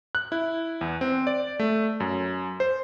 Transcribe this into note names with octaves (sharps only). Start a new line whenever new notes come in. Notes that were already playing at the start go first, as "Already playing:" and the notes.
F#6
E4
E2
C4
D5
A3
F#2
C5